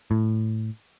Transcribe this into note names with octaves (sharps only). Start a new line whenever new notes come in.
A2